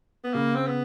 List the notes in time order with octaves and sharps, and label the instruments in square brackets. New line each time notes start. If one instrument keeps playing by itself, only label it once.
[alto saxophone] B3
[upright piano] C#3 [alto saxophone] A#3
[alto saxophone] C4
B3